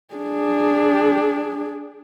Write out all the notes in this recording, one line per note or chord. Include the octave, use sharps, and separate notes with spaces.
D4 G#4